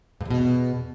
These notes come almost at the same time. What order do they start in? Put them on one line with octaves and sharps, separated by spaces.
G2 E2 B2